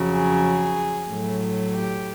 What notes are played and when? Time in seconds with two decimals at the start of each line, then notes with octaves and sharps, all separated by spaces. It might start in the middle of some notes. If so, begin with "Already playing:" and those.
Already playing: F2 C#3 F#3
0.13 G#4
1.10 A2 F#3 A3
1.74 G4